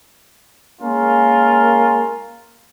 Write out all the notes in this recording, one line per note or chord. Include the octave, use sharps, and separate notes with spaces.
G#3 A#3 C#4 F4 A#4